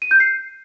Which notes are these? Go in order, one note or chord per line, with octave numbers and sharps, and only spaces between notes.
D#7
G6
C7